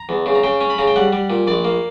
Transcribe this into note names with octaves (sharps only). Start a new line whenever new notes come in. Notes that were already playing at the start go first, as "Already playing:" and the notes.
Already playing: A#5
E2
C#3
A#5
C#3 G5
C#4
B5
C#3 A#5
G5
G3 F#5
G3
A#2
A#1 D5
A#3